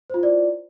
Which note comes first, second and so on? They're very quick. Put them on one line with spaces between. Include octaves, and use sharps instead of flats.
C5 F4 E4 D5